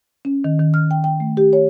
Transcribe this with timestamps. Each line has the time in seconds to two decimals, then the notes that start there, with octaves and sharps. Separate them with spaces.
0.25 C#4
0.44 D#3
0.60 D#3
0.74 F6
0.91 G5
1.04 G5
1.20 A3
1.37 G4
1.53 C#5